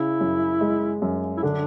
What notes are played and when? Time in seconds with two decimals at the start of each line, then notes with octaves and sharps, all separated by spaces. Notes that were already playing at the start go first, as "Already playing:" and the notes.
Already playing: C#3 E4
0.21 F#2
0.61 G#3
1.02 F#2
1.37 E4
1.43 D3 D4